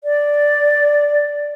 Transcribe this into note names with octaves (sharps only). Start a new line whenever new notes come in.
D5